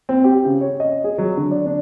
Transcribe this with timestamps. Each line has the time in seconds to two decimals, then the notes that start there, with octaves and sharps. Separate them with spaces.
0.09 C4
0.24 G4
0.45 C#3
0.61 C#5
0.80 D#5
1.04 G#4
1.18 F#3
1.37 D3
1.51 D5
1.66 D4